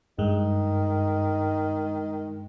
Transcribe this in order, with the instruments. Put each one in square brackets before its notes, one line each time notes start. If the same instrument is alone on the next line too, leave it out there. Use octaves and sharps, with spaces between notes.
[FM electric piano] G2 G#3 [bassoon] D#3